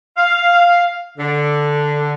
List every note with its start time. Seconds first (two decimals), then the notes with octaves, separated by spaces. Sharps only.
0.17 F5
1.18 D3